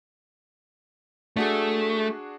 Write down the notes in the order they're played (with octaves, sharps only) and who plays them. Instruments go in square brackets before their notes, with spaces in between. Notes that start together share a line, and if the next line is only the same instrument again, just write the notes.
[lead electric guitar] A3 [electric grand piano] D4 F#4 G#4